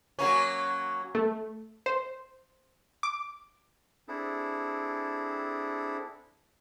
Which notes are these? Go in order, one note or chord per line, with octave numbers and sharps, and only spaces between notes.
F#3 A#3 C#4
A3
C5
D6
C4 D4 E4 G#4 A4